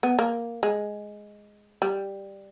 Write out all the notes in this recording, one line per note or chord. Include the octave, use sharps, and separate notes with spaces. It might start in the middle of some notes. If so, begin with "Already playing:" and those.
B3
A#3
G#3
G3